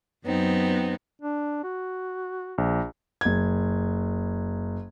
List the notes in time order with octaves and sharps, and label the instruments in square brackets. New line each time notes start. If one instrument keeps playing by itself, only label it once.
[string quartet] F#2 B3 C4 D#4
[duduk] D4
F#4
[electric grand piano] A#1
[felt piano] F#1 G#6